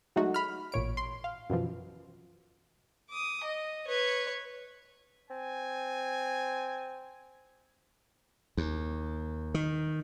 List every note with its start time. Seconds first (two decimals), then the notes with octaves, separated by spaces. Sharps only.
0.16 F#3 G#3 A3 D#4 F#4
0.34 B5 F6
0.72 A1 A#2 C#5 D7
0.97 C6
1.24 F5
1.50 F#2 B2 E3 F3
3.10 D6 D#6
3.44 D#5
3.87 B4 C#5
5.30 C4 G#5
8.57 D#2
9.54 D#3